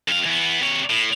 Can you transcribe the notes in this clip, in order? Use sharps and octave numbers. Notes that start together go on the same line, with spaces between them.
F2 F5
E3 B3
C3 C#5
A2